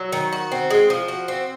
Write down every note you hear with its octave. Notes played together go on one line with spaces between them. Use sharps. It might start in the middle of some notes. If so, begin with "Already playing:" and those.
Already playing: F#3
D#3
F#4
C4
G#3
F3
F#4
C4